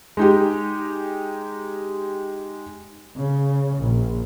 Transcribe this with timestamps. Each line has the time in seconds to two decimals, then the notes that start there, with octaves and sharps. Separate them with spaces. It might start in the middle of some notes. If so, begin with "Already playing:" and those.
0.17 G#3 D#4 G4
3.16 C#3
3.79 A#1